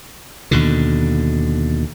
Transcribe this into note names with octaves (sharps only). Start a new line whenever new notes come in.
D#2 B2 D3